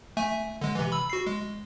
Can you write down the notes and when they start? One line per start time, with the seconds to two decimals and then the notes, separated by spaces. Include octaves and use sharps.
0.17 A3 E5 G#5
0.61 D3 G#3
0.75 C3 E3
0.92 B5 E6
1.10 F#4 C7
1.27 G#3